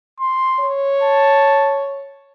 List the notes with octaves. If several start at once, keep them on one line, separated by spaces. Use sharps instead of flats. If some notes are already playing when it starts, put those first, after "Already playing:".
C6
C#5
A5